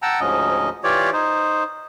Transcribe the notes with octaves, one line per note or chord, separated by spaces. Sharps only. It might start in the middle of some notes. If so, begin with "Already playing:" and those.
F#5 G5 A5 A#5 E6
D2 G#2 F3 C#4 D#5
E3 F4 G4 C#5 D5
D#4 C5